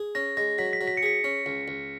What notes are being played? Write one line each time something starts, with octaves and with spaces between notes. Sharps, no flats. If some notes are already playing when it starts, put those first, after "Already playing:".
Already playing: G#4
C#4 A#6
G#3 A#6
F#3 B6
B6
F#3
B6
C#7
G#4 B6
C#4
C#2
C#2